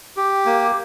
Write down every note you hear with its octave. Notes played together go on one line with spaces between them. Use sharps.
G4
A#3